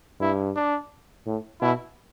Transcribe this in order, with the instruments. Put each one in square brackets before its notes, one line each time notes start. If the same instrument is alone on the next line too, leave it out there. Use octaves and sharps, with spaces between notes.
[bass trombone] G2 [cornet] E4
[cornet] D4
[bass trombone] A2
[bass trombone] B2 [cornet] E4